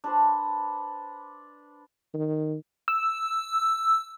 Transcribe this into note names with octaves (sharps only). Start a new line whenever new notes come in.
D4 B4 C5
D#3
E6